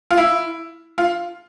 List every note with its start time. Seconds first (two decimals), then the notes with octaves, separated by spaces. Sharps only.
0.11 F4
0.17 E4
0.98 F4